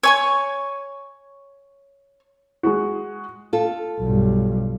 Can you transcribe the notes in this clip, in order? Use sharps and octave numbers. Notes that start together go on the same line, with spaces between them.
C#5 G#5 C#6
G#3 F#4
F4 A4
B1 G2